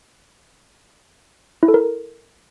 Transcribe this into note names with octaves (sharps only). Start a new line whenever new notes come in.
E4
A4
A#4